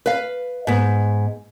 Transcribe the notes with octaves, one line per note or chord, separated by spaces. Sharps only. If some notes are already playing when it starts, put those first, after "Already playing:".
B4 F5
G#2 B3